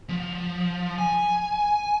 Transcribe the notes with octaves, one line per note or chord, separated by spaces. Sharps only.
F3
G#5